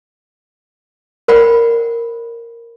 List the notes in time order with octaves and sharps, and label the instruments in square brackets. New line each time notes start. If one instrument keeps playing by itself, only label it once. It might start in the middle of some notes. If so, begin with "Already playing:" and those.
[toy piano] A#4 C5 D5 F#5 G5 B5